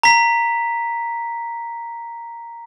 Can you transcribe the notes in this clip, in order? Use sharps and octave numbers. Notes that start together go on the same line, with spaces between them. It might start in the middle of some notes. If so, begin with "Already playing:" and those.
A#5 B6